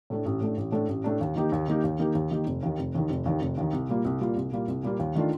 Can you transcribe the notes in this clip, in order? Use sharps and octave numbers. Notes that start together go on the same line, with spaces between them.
A2 A3 D4
A1
A2 A3 D4
A1
A2 A3 D4
A1
A2 A3 D4
D#2
D#3 A#3 D#4 G4
D#2
D#3 A#3 D#4 G4
D#2
D#3 A#3 D#4 G4
D#2
D#3 A#3 D#4 G4
F1
D#2 D#3
F1
D#2 D#3
F1
D#2 D#3
F1
D#2 D#3
C2
A#2 G3 A#3 F4
C2
A#2 G3 A#3 F4
C2
A#2 G3 A#3 F4
C2
A#2 G3 A#3 F4
D#2
D#3 A3 D4 F4